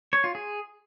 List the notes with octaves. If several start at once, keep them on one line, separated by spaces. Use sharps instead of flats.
C#5
F4
G#4